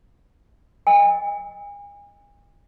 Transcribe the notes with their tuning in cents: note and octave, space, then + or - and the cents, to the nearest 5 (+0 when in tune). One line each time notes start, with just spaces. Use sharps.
D#5 +0 G#5 -35